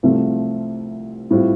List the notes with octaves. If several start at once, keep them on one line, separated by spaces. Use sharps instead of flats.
C2 C3 F3 A3 F4
A2 G3 C4 F4